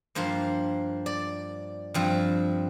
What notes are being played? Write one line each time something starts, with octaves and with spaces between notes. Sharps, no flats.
G2 F3 A#3 C5
D5
G2 F3 C4